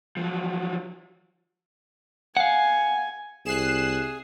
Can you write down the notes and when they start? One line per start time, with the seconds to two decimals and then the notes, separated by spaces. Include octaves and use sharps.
0.17 F3 F#3
2.37 F5 F#5 G#5
3.46 C2 G#4 F#6 C7 E7